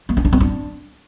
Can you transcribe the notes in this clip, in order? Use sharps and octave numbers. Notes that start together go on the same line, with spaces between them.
A#3
C#4
D4
C4
D4